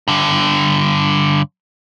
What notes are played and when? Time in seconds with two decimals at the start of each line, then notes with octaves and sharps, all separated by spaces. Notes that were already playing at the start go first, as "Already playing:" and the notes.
0.08 G2 D3